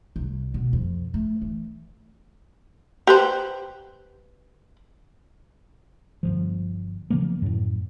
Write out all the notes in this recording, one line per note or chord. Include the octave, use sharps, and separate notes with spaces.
C2
B2
F2
A3
E3
G4 B4 C5
G1 C#2 F3
C#3 F3 F#3 A#3
F#2 A2